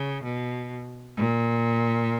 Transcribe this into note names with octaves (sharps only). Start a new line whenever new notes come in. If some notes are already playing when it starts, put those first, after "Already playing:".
Already playing: C#3
B2
A#2